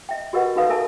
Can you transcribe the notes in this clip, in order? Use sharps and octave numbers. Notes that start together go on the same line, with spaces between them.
D#5 E5 G5
F#4 G4 A#4 B4 D#5 F#5
D#4 F#4 A4 B4 F5 D#6
A4 A#4 E5 F5 G#5 A5